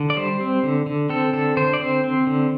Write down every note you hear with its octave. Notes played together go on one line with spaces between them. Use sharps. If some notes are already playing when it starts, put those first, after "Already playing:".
Already playing: D3
D5
G3 C5
C4
D3
D3
C4 A4
D3 A4
D3 C5
D5
C4 C5
C4
D3